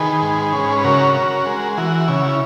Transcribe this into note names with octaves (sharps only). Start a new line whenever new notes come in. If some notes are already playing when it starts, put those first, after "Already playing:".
Already playing: D#3 G#4 B4
G#2
C#4
B4
C#3 F#4 A#4
C#4
G#3
E3 F#4
C#3 E4